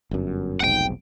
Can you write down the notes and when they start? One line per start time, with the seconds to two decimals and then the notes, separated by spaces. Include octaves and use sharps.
0.11 G1 F#2
0.60 F1 B1 G#2 F#5 G5